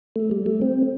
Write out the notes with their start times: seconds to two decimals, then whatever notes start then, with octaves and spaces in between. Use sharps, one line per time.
0.16 A3
0.31 G3
0.46 A3
0.62 C4